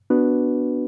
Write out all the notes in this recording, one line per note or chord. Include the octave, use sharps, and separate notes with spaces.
B3 D4 F#4 B4